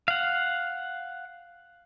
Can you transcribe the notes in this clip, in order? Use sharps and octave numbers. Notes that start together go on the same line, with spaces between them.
F5 F#5